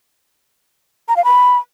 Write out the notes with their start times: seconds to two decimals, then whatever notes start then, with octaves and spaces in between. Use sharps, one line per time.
1.09 A#5
1.17 F5
1.24 B5